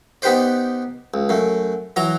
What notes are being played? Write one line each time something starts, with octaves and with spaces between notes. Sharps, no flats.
B3 D#4 G4 B4 C5 D5
C#2
F#2 A3
E3 F#3 A#5